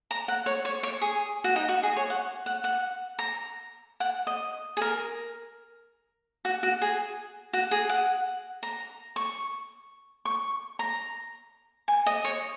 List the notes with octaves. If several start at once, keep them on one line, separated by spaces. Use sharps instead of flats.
A#5
F#5
C#5
C#5
C#5
G#4
F#4
D#4
F#4
G#4
C#5
F#5
F#5
F#5
A#5
F#5
D#5
G#4
A#4
F#4
F#4
G#4
F#4
G#4
F#5
A#5
C#6
C#6
A#5
G#5
D#5
C#5